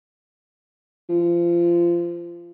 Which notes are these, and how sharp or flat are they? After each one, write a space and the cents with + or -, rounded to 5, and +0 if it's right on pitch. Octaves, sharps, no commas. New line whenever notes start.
F3 -25